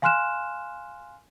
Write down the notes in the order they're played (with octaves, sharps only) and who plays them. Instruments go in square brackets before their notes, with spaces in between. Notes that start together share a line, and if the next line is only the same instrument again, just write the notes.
[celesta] F5 G#5 C6 F6 F#6 E7